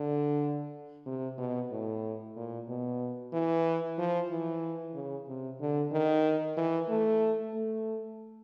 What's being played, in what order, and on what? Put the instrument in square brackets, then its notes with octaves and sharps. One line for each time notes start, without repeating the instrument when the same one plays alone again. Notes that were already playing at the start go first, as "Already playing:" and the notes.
Already playing: [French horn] D3
C3
B2
A2
A#2
B2
E3
F3
E3
C#3
C3
D3
D#3
E3
A3
A3